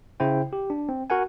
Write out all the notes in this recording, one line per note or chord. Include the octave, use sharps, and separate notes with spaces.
C#3 E4 C5 G5
G4
D4
C4
F#4 A#4 F#5 G#5